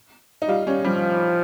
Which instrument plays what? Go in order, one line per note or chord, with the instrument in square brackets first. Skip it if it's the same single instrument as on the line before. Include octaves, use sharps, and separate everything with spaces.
[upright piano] D#4
[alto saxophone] G3 [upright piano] F4
[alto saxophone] G3 [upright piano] C#4
[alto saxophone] F3 [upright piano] G3